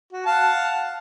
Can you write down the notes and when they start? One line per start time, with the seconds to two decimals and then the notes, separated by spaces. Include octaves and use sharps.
0.13 F#4
0.26 F5 F#5 A5